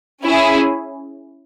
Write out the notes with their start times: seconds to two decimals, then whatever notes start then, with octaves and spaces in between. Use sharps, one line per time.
0.24 C#4 E4 G#4